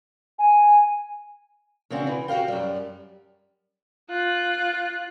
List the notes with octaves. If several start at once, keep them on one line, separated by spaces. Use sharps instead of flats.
G#5
C#3 E3 C4 D4 F#4
E3
F#4 G4 D#5 F5 G5
F#2 G3
F4 F#6